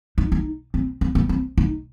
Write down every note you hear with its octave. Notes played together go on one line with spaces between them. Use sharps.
D#4
D#4
C4
C4
B3
C4
D#4